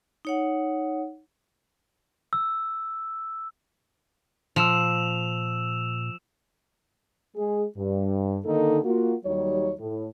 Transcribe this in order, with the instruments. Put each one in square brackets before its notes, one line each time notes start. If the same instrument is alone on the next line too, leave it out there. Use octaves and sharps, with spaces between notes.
[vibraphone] D#4 C#5 F#5
[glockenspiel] E6
[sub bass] A#2 [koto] F3 [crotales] E6 E7 F7
[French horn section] G#3 G#4
G2
D3 D#3 A#3 D#4 A4
A#3 F4 F#4
D#2 F#3 G3 D#4 C#5
A2